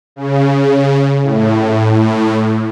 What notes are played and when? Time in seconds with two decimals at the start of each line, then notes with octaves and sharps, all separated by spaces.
0.16 C#3
1.23 A2